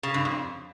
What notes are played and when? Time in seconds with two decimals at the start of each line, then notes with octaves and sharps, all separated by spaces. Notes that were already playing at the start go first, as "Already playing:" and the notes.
0.03 C#3
0.14 G2
0.25 F2